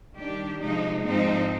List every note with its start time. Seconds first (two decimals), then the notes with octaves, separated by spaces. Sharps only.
0.15 D#3 G3 D4 G4
0.60 C3 F3 G#3 D#4
1.05 G#2 F3 G#3 C4 D#4